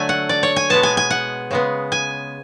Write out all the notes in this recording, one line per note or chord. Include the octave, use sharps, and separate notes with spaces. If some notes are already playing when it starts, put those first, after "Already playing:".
Already playing: D3 F#3 A3 G#5
F#5
D5
C#5
G#5
B2 G#3 B3 A5
G#5
G#5
F#5
C#3 G#3 B3
G#5